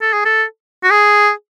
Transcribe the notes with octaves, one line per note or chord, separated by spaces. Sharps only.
A4
G#4
A4
F#4
G#4